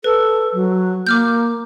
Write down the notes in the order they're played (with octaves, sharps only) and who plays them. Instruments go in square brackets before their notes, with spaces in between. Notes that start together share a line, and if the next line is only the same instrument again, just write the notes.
[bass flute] A4 [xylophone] B4
[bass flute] F#3
[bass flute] A#3 [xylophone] D6 F6 G6